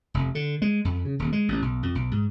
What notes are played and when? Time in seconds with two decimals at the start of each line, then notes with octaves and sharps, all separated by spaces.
0.14 F1
0.35 D3
0.62 G#3
0.85 F2
1.05 C#3
1.19 D#1
1.33 G#3
1.48 A1
1.62 B1
1.83 F2
1.95 B1
2.11 G#2